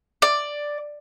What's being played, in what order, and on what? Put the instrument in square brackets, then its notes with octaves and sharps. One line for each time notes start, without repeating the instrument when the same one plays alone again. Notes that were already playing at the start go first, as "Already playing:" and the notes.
[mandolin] D5